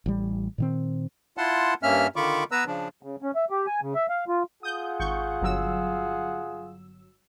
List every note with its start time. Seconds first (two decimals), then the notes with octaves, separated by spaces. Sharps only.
0.06 A1 G3
0.58 A#2 D#3 C4
1.37 E4 F4 F#5 A5 C6
1.83 G2 A#3 C#4 E5 F6
2.16 D3 D#3 F4 B5 C#6 D6
2.52 B3 B4 A#5 E6
2.67 C#3 F3 D4
3.03 C#3
3.22 C#4
3.36 E5
3.50 G4
3.67 G#5
3.81 C#3
3.95 E5
4.09 F5
4.28 F4
4.63 F4 G#4 F#5 D#6 G6
5.00 G#1 C#6 G6
5.41 G1 F#3 E6